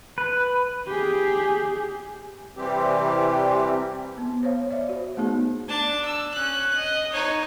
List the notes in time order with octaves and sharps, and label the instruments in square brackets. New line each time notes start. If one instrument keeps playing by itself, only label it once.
[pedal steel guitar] B4
[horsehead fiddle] G4 G#4
[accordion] C3 E3 G3 C4 G4
[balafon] B3
C5 C#5 F5
D5 E5
F#4 C5
A3 B3 D#4 G#4
[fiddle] D4 A5
E6
C#4 F#6
D#5
D#4 C#5